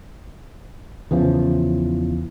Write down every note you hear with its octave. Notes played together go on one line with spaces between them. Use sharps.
E2 C#3 E3 F3